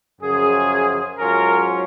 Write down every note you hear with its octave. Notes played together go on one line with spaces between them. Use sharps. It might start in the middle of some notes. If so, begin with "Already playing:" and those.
F#2 C#3 F3 G#4
G#2 F#3 C#4 F4 A#4